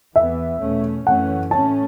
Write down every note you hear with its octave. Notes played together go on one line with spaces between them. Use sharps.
E2 E3 B3 E5
E2 B2 A3 C#4
F#2 E3 A3 C#4 F#5
A2 A3 C#4 A5